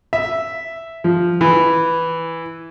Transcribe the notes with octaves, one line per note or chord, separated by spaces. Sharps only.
E5
F3
E3